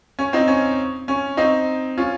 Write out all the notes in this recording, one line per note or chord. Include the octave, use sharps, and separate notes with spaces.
C#4
C4 D#4
C#4
C#4
C4 D#4
C#4 F4